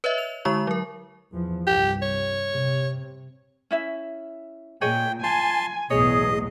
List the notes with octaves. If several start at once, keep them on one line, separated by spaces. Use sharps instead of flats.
B4 C#5 D#5 E5
F7
D3 G#3 E4 C#6
F#3 A#4
E2 E3 F3
C2 G2 G4
C#5
C3
C#4 E4 E5
A#2 G#4 C#5 D#5 G5
F4 G#5 A5 C6
B1 E2 A2 G#4 C#5 D#5